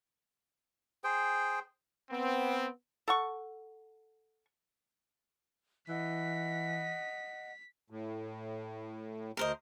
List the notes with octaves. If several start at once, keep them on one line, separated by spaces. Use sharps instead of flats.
G#4 C5 G5
B3 C4
A4 F#5 C#6
E3 D#5 F#5 B6
A2
D2 A#4 C5 D#5